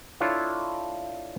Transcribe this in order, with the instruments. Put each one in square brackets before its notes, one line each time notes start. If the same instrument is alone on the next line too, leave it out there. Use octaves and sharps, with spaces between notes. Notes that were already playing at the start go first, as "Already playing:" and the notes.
[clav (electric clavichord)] D4 E4 F4 A4 C#5 F5